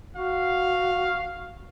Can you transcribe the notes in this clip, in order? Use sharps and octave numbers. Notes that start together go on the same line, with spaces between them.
F#4 F5